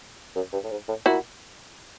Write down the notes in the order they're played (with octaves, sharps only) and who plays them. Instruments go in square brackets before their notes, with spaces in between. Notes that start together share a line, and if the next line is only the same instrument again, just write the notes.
[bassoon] F#2
G2
A2
G#2
A2
[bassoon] A#2 [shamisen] E4 F#4